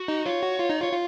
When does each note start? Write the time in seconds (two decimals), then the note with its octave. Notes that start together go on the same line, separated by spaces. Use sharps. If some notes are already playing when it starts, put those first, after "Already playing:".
Already playing: F#4
0.08 D#4
0.26 F4 C#5
0.43 F#4
0.59 F4
0.70 D#4
0.81 F4 C#5
0.92 F4